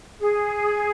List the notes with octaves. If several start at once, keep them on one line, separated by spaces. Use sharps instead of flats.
G#4